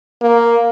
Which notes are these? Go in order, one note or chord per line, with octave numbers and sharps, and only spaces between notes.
A#3